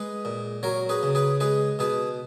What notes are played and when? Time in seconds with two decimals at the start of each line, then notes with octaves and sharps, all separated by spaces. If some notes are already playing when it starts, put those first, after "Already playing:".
Already playing: G#3 G#4 B4
0.25 A#2
0.63 F#3 A#4 C#5
0.89 G#4 B4
1.03 C#3
1.15 G#4 B4
1.40 G#3 G#4 B4
1.79 B2 G#4 B4